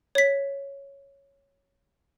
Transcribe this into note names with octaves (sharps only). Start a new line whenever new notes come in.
C#5 B6